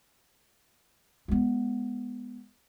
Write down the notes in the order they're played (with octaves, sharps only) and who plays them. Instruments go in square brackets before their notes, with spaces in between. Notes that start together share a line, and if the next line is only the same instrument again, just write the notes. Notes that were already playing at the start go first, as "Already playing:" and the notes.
[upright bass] G#3 B3